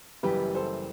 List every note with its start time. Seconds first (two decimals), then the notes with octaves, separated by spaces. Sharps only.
0.23 F#1 F#2 E3 G3 G4 B4
0.55 A4 C5